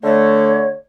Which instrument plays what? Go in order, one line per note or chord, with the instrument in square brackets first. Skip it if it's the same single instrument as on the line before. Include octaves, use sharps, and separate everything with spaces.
[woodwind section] D3 A3 [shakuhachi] C#5